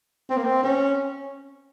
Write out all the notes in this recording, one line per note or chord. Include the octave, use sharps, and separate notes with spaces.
C4
A#3
C4
C#4